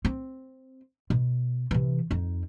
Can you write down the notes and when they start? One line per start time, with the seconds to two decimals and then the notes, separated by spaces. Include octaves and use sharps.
0.05 C4
1.10 B2
1.71 C3 E3
2.11 F2 D#4